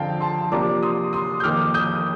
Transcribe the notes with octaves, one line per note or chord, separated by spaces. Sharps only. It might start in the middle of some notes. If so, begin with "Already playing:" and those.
Already playing: F2 D3 F3 C4 F5 G5 A5
A5 C6
C3 F3 A#3 D4 F4 A#5 D6
C6 D#6
C6 D#6
G6
F2 D#3 A#3 D6 F6
D#6 G6